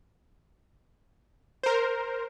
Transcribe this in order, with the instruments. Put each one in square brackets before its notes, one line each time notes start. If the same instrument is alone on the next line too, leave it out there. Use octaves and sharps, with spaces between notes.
[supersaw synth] A#4 C5